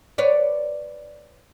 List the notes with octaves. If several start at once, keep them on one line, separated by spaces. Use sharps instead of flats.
B4 C#5 D5